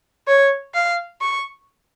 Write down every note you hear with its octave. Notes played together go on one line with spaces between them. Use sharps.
C#5
F5
C#6